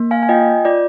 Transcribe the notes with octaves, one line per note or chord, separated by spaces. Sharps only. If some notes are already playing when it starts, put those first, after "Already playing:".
Already playing: A#3
F5 G#5
G#5
F4 D#5 G5
F4 D5